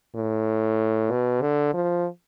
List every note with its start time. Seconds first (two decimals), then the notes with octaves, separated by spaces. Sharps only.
0.16 A2
1.11 B2
1.42 D3
1.74 F3